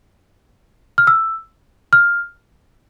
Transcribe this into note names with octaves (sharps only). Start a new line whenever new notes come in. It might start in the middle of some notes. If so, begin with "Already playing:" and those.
F6
E6
F6